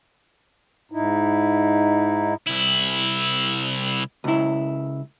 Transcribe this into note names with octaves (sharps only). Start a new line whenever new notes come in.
G#2 D#4 E4
C2 E4
C#2 E4